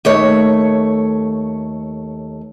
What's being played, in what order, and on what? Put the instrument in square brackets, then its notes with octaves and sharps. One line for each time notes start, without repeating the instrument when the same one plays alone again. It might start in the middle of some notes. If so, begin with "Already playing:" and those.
[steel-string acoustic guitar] D#2 A3 C#5